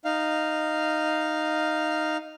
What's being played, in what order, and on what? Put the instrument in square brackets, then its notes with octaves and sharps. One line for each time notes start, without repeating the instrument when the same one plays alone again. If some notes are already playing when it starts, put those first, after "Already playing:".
[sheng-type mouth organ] D#4 F5